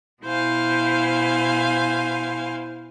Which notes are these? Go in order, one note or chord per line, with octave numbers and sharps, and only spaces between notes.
B2 E4 C5 F5 G#5